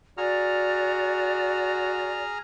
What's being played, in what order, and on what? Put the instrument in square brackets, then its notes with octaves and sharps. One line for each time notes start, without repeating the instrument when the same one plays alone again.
[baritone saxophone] F#4 [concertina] G#4 A#5 F6 [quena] D5